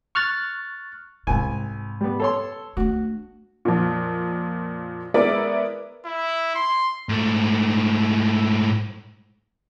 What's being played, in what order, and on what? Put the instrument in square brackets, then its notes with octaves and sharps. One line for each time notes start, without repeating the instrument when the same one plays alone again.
[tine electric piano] C#6 F6 F#6 A6
[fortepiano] C2 G#5 [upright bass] G#2 C3
[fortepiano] G3 B3
A4 C#5 C6
[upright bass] A3 D4 [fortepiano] F#4
[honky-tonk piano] F2 A#2
G#3 B3 E4 A#4 D5 E5
[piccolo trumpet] E4
C6
[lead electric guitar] G#2 A3